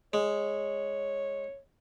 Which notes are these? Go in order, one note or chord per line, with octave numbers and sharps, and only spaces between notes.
G#3 C#5